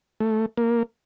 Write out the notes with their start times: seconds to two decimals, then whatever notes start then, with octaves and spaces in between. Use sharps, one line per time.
0.20 A3
0.57 A#3